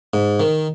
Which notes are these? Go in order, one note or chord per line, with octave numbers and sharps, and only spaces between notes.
G#2
D#3